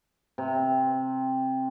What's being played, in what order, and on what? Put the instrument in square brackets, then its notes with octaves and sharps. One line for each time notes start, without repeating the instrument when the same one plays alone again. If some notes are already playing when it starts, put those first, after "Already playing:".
[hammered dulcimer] C3